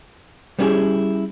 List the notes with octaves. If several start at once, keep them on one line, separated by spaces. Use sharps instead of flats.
G3 B3 C#4 E4 G4 G#4